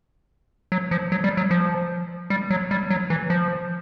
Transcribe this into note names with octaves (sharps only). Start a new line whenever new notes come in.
F#3
F3
F#3
G3
F#3
F3
G3
F#3
G3
F#3
E3
F3